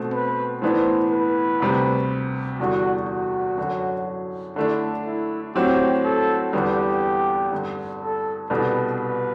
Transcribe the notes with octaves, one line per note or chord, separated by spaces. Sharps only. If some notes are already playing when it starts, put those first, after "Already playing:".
Already playing: B2 A3 C4 F#4
B4
A2 E3 B3 D4 C5
B4
D2 C3 G3
E2 D3 G3 F#4
F#4
F#2 D3 F#3
D3 A3 D4 E4
E4
A2 F#3 C4 F#4 G4
A4
E2 D3 G3 B3 G4
G2 D3 G3
A4
C2 B2 G3 D4 A4 B4
B4